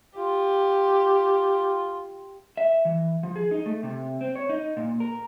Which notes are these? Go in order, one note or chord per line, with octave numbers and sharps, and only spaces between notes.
F4 G4
E5
E3
F3
G#4
D#4
A3
C3
C4
C#5
D#4
A#2
A#4